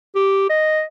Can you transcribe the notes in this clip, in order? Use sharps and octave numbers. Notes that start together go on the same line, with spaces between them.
G4
D#5